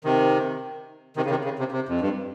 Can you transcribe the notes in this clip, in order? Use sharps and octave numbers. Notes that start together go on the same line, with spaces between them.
C3 D#3
C3 D#3
C#3
C3 D#3
C#3
C3
C3
F2
G2